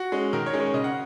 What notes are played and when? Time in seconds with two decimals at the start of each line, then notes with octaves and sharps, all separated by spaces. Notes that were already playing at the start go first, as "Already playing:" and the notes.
Already playing: F#4
0.12 G#3 C#4
0.33 D#3 A#4
0.46 C#5
0.53 G#3 C#4
0.60 C#5
0.74 C#3 D#5
0.84 F#5